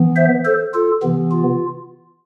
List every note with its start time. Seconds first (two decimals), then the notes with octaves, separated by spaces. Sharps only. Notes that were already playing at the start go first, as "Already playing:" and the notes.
Already playing: E3 B3
0.16 C5 E5
0.44 A4 C5
0.74 F4 A4
1.03 C3 E3 B3
1.31 F4